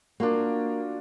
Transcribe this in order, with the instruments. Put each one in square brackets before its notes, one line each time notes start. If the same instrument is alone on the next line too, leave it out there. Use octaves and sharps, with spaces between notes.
[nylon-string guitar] A#3 [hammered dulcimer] D4 F4 F#4